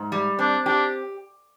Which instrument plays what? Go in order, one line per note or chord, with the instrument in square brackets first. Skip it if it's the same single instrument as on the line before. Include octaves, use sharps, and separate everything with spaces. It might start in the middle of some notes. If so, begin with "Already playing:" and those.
Already playing: [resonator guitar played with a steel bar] G#2
G3
[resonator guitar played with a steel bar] C4 [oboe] D4
[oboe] D4 [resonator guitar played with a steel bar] G4